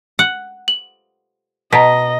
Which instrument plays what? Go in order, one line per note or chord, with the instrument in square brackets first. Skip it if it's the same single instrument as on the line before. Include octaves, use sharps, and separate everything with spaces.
[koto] F#5
[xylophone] F#7
[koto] B2 [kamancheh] D#5 [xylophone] A#5 B6